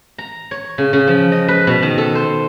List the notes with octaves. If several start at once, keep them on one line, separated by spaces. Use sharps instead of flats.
A#5
C#5
C#3
C#3
F3
D#5
B4
B2
D#3
A4
C5